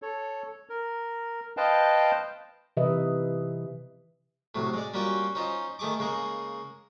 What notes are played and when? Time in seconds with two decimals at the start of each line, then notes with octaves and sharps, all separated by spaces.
0.02 A4 C#5
0.69 A#4
1.57 B4 C5 D#5 F5 G5 A5
2.77 C3 E3 B4 D#5 E5
4.55 A2 C3 F#3
4.74 G#3 D5
4.94 G3 A#3 C#4 F4 F#4 G5
5.35 C#4 D#4 F4 C5 D#5
5.79 D#3 A3 G#4 C#6 D6
5.99 C#3 G#3 A#3 G#4